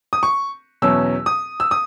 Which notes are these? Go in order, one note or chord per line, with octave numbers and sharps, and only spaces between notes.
D#6
C#6
E2 B2 F#3 C#4 E6
D#6
E6
D#6